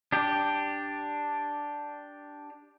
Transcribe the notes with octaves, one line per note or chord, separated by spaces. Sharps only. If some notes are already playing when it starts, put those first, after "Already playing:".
D4 G4